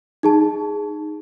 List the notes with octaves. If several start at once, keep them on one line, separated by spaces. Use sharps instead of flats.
D#4 G#4 A5